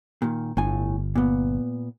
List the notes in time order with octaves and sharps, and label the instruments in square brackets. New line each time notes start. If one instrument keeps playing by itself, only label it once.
[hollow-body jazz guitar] A#2 D#3
[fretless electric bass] G1 [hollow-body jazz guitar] A2 G#5
[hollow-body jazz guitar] A#2 B3